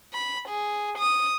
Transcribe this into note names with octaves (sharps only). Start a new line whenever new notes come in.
B5
G#4
D#6